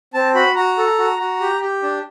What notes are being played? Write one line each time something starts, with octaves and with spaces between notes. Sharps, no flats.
C4 A5
F#4 B5
F#4 A#5
A4
F#4
F#4
G4
G4
D4